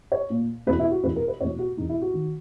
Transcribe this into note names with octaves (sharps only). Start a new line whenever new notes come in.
C#5
A#2
E2 B2 B4
E4
F#4
E2 B2 B4
A#4
B4
E2 B2 C#5
F#4
E2 B2 D#4
E4
F#4
D#3